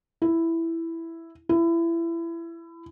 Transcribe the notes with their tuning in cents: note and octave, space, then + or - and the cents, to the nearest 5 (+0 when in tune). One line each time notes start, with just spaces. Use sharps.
E4 +5
E4 +25